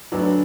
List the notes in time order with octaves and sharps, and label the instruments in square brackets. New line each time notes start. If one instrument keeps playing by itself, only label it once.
[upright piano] D2 D3 F#3 B3 D4